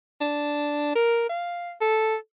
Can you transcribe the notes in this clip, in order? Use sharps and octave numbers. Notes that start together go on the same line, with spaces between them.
D4
A#4
F5
A4